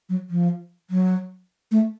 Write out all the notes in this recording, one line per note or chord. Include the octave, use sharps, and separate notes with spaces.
F#3
F3
F#3
A3